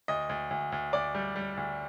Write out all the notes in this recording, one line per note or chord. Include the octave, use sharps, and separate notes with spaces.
D2 D#5
D2
D2
D2
D2 D5
G3
G3
D2